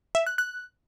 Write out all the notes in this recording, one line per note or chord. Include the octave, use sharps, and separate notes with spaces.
E5
F#6
F#6